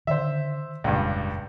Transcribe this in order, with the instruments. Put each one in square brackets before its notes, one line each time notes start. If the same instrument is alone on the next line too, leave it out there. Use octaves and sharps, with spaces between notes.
[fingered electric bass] D3 D#3 [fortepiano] C5 E5
[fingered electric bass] F1 A#2 [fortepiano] C#2 G2